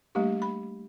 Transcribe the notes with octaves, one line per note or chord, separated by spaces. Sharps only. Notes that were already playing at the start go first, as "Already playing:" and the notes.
G3 A3 A#3 D4 G4
B5